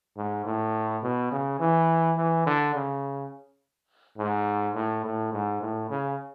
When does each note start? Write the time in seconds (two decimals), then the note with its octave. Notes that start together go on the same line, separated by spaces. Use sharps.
0.17 G#2
0.46 A2
1.03 B2
1.32 C#3
1.60 E3
2.17 E3
2.46 D3
2.75 C#3
4.18 G#2
4.75 A2
5.05 A2
5.33 G#2
5.61 A2
5.90 C#3